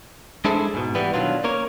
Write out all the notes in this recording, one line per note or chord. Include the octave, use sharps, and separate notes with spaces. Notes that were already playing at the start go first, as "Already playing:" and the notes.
G#3 D4 E4 G#4 A4 C5
G#2 B2
E3 G3 B3
B2 D#3 F#3 D4 F4
A#3 C#4 A#4 C#5